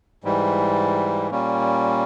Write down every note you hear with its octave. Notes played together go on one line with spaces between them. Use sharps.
G#2 E3 G3
A#2 G3 A#3 C#4